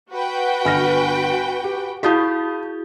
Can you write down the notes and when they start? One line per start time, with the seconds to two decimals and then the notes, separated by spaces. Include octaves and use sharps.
0.11 F#4 B4 G5
0.65 G1 G#5 F6 A#6
1.64 G4
2.03 E4 F#4 G#4 F5 D#6 G6